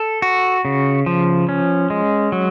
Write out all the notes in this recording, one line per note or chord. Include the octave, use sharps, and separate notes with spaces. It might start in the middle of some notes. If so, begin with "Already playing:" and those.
Already playing: A4
F#4
C#3
F3
C#4
G#3
F#3